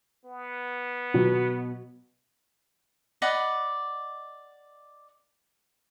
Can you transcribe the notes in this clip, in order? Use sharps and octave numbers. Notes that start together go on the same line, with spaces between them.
B3
B2 F#3
D5 D#5 F#5 B5